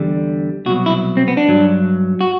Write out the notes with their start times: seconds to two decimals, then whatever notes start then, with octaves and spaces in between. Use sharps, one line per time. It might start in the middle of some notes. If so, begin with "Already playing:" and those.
Already playing: E2 D3 G3
0.66 C2 B2 F#3 F#4
0.86 E4
1.17 C4
1.28 B3
1.37 D4
1.48 G2 F#3
2.21 F#4